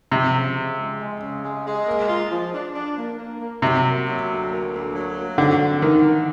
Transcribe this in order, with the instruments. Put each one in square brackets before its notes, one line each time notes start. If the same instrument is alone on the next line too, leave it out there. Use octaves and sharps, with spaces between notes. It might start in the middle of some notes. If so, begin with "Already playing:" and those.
[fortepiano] C3 [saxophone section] F3
[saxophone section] C#3
C#3
G#3
G#3
C#3
G#3
G#3
A#3
F4
F3
D4
D4
A#3
A#3
A#3
[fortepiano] C3 [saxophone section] F#3
[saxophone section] A#3
F#3
D2
A#3
D2
F#3
A#3
[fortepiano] D3 [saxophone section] C4
[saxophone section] C4
[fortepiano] D#3 [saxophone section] E3
[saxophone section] E3